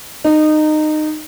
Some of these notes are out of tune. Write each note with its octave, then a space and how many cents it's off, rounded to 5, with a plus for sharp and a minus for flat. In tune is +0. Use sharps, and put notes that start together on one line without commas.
D#4 -20